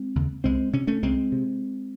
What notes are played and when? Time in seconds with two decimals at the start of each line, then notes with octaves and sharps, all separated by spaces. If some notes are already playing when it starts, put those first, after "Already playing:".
Already playing: G#3 C4
0.16 D#2 C#3
0.44 C2 G#3 C4
0.73 C3 C#4
0.87 A3 C#4
1.03 C2 G#3 C4
1.32 C3